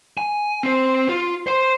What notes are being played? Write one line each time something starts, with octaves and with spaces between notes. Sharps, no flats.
G#5
C4 C5
F4
C5 C6